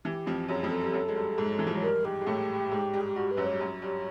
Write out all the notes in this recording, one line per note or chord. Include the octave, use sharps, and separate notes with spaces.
E3 G4
F2 F3
F#2 F#3 G#4
F2 F3
A4
G3
F#2 F#3
G#3
G2 G3
G#2 G#3
E3
F3
F#3
G2 G3 A#4
G#2 G#3 G4
G#3
A2 A3
G#2 G#3
G2 G3
G#4
G4
G2 G3 F#4
B4
F#2 F#3
C#5
G3
F#2 F#3
G2 G3